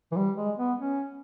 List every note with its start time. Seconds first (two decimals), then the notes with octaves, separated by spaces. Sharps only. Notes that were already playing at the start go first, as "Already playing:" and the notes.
0.12 E3
0.16 G3
0.37 G#3
0.58 B3
0.78 C#4